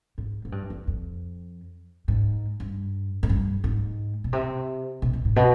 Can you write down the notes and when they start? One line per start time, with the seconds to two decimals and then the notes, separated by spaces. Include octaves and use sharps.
0.18 G#2
0.45 G#2
0.52 G2
0.70 F2
0.87 F2
2.08 G#2
2.60 G2
3.23 G#2
3.29 G2
3.64 G#2
4.24 B2
4.33 C3
5.02 B2
5.13 B2
5.25 G#2
5.36 B2